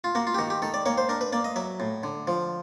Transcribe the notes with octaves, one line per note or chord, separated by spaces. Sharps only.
F4
A#3 F#4
F4
G4
D#3 F#4
G4
D#3 A4
D5
A#3 C#5
C5
D4 A#4
B4
A#3 D5
D#5
F#3 E5
A2
D3
F3